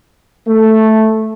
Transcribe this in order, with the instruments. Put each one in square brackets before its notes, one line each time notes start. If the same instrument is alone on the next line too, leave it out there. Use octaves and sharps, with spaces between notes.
[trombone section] A3